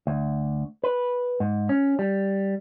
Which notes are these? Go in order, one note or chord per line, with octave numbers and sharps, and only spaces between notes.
D2
B4
G#2
C#4
G3